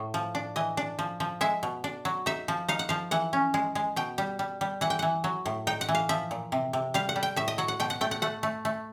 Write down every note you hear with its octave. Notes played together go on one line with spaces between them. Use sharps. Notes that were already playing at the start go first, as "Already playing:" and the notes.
Already playing: A2
F3
D4
E3 D#5
D4
F3
F3
G#3 E5
B2
D4
F#3
D#4 E5
F3
D#4 F5
F#5
F3 F5
E3 F#5
C#4
G#3
G#3
B2 G5
G3
G3
G3
E3 F#5
G5
E3 F#5
F#3
A2
D#4 G5
F#5
E3
F5
F3 E5
A#2
C3
C3
G3 F5
F#5
G3
G5
A2 E5
D#5
F#3 F#5
F#5
B2 G5
F#5
A3 G5
F#5
A3 F#5
A3
A3